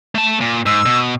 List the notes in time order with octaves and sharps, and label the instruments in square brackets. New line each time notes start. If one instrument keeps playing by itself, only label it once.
[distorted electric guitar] A3 A5
A#2
[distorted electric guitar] G#2 [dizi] E6
[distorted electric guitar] B2